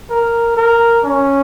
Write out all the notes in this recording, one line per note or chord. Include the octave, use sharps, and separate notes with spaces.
A#4
A#4
C#4